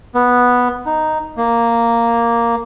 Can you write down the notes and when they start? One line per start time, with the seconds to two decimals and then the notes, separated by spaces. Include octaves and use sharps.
0.15 B3
0.86 D#4
1.37 A#3